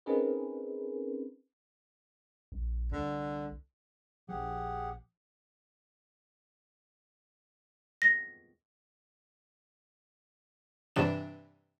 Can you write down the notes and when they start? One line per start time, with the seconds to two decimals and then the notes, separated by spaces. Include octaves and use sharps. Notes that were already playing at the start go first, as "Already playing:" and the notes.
0.06 C4 C#4 D#4 G#4 A#4 B4
2.52 A#1
2.92 C2 D3
4.29 A#1 F3 G4 G#4 F#5
8.02 A#6
10.96 G2 C3 E3 D4 E7